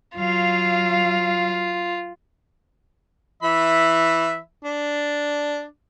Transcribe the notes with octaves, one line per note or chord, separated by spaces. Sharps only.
F#3 F4 F5
E3 E5 B5
D4